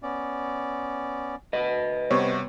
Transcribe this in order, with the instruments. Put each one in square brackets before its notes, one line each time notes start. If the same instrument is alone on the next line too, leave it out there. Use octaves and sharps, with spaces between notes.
[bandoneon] B3 C#4 D5
[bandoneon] D2 [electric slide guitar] B4 D#5
[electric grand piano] C3 G3 C5 [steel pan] B3 C#5